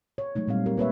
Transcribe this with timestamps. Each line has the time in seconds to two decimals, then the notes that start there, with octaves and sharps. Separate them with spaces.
0.18 C#5
0.35 F#3 G#3 A3 D#4
0.48 A#2 G3 C4 F5
0.66 C4 G4 A#4
0.77 A#3 B4 C#5 E5